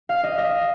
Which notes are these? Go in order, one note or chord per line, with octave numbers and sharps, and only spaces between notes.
F5
D#5
D#5